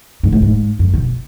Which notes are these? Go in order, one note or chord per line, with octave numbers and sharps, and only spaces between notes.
G#2
A2
G#2
F#2
B2